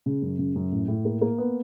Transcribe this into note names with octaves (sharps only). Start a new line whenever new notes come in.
C#3
F#2
C#3
F#2
A2
A2
A#3
A#3
B3